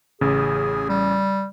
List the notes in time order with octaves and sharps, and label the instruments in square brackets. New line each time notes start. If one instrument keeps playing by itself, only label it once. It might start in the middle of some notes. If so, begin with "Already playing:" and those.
[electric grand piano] A1 C#3 [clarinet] G#4
[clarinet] G3